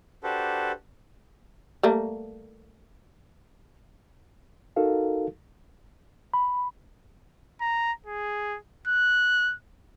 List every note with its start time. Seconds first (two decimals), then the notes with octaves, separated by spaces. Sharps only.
0.23 D4 F#4 G4 A4 B4 C5
1.83 G3 A3 A#3
4.76 D#4 F#4 A4 A#4 F5
6.34 B5
7.61 A#5
8.06 G#4
8.87 F#6